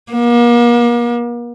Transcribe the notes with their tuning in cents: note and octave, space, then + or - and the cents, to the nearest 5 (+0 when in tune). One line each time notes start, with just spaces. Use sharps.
A#3 +40